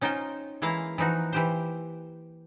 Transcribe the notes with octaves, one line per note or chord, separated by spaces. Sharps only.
C#4 D#4 F4 C5 G5
E3 G#3 A#3 E4 F5 A#5
E3 F3 D#4 F#4
E3 G4 C5